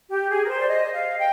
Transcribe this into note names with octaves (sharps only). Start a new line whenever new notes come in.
G4
G#4
A#4
C5
D5
D#5
F5
G5